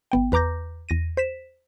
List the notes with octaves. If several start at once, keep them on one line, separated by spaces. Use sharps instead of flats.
G1 B3 G5
E2 B4 A#5 D6 G6 A#6
E2 A#6 D#7
C5 B6 E7